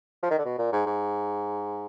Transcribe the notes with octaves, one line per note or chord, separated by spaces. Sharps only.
F3
D#3
D3
B2
A#2
G#2
G#2